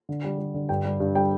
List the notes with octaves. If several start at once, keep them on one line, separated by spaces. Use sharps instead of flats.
D3
G3
G3
D3
G2 G5
G3
G2
G3 G5